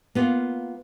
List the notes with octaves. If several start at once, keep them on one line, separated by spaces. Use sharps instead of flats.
A#3 B3 F4